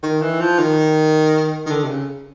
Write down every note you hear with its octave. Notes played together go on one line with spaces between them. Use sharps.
D#3
E3
F3
D#3
D#3
D3
C3
C#3